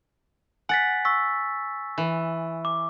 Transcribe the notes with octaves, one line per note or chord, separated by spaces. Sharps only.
F#5 G#5 A6 B6
C#6 E6 B6
E3
D6